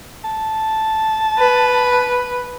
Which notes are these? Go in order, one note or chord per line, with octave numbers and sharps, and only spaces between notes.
A5
B4